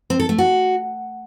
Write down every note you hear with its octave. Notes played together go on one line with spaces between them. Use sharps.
C4
A4
A3
F#4